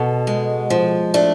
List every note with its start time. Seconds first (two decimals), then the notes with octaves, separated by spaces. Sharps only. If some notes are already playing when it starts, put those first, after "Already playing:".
Already playing: B2 A4
0.27 G#3
0.70 F3
1.14 A3 D4